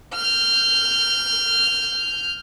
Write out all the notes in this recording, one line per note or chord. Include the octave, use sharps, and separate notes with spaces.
F6 G6